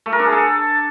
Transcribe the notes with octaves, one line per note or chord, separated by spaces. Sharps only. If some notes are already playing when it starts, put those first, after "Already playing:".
A3
A#4
D4
G#4
A4